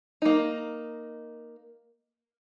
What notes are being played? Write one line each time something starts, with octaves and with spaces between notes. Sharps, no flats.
A#3 D#4